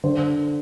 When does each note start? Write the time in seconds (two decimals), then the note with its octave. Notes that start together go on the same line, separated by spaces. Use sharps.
0.04 D3 C5